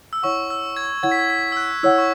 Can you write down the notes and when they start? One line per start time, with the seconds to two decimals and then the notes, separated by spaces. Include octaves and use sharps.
0.13 E6
0.23 E4 C#5 F#5 C#6
0.50 E6
0.77 G#6
1.03 E4 C#5 F#5 G#6
1.12 B6
1.19 G#6
1.30 B6
1.52 E6
1.57 F#6
1.83 E4 C#5 F#5 E6
1.98 C#6